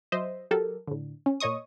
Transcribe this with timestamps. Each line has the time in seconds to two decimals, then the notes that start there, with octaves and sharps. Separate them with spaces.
0.12 F#3 C5 D#5 E5
0.51 F#3 G4 A4 A#4
0.87 A2 D3
1.26 C#4
1.40 A#2 C#5 D#5 C#6 D#6